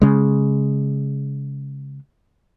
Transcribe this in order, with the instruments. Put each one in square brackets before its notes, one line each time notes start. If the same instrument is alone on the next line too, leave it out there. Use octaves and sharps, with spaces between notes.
[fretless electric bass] C#3 G#3